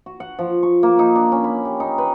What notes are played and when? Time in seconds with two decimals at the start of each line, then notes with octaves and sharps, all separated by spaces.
0.06 F#4
0.20 F#5
0.39 F3
0.63 C#6
0.83 A#3
0.99 D#4
1.15 D4
1.32 C#4
1.44 B5
1.65 G4
1.80 D#4
1.98 B4